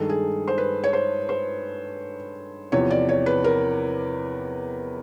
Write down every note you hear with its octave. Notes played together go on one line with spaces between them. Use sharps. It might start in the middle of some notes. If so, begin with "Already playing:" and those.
Already playing: G2 D#3 G#3 A4
G#4
C5
B4
C#5
C5
C5
E2 C3 F3 C#5
D5
C#5
B4
A#4